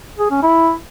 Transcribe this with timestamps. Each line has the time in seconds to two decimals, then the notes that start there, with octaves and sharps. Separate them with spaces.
0.19 G#4
0.31 C#4
0.42 E4